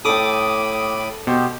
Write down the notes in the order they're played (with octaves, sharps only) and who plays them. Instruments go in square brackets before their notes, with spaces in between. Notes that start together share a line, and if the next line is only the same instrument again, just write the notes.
[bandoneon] A2 B5 [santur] A4 G5 [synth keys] D6 D#6
[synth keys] B2 [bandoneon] G4 C5